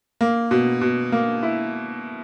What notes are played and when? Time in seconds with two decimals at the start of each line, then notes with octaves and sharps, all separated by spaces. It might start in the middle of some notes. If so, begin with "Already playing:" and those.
0.21 A#3
0.51 B2
0.81 B2
1.12 A#3
1.43 E4